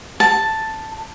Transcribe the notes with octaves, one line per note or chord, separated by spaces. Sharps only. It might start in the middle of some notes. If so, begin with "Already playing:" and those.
A5